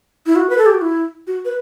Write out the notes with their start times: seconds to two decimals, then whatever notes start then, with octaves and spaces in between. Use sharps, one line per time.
0.26 E4
0.36 F#4
0.50 B4
0.58 A4
0.66 G4
0.74 F#4
0.81 E4
1.27 F#4
1.45 B4